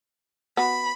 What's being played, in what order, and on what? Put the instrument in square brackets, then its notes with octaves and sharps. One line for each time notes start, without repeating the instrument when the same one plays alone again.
[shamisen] B3 F#4 [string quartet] B5